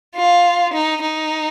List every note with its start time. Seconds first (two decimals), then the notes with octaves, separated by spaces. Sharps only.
0.16 F4
0.74 D#4
1.02 D#4